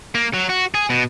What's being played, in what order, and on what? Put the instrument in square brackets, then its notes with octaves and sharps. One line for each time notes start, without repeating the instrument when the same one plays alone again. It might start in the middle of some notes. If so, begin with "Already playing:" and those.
[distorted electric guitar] A#3
F#3
F#4
G#4
B2